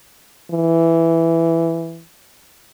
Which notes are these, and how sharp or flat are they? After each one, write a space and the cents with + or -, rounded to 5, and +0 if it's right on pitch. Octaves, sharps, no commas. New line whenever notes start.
E3 +5